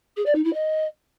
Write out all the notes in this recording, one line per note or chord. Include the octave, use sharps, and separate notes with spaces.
G#4
D5
D#4
E4
D#5